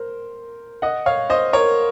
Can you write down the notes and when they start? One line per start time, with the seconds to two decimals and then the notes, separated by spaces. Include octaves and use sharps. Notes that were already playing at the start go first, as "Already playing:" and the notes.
Already playing: A#4 C5
0.82 D#5 F#5
1.06 C#5 F5
1.30 C5 D#5
1.53 A#4 C#5